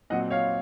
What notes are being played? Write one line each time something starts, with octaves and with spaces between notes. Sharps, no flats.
A#2 F#3 C4 D#5 F#5
C#5 F5